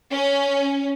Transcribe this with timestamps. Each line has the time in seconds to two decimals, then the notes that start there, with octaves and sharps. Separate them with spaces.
0.13 C#4